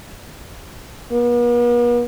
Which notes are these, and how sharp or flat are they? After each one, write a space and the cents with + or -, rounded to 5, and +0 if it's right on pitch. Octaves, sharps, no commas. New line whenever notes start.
B3 -45